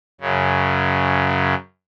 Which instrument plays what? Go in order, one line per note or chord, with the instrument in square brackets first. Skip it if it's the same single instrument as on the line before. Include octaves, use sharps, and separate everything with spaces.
[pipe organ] F#2 C#3